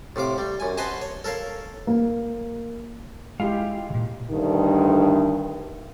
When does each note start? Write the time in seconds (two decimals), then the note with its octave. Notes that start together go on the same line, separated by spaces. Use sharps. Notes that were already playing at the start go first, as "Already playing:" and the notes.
0.16 A2 C3 F5 D6
0.38 G3
0.60 F#2 G#5
0.77 B4 C5 D#5 F#5 G#5 A5
1.02 C#5
1.24 A4 A#4 C#5 F5
1.87 A#3
3.40 G#3 E4 F4 G4 F5
3.90 A#2 C#3
4.31 D2 G2 D#3